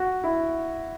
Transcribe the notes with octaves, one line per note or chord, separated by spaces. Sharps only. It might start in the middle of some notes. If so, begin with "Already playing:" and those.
Already playing: F#4
E4